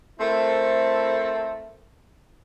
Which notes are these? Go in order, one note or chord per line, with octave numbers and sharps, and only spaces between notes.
A3 C4 E4 A4 A#4 C5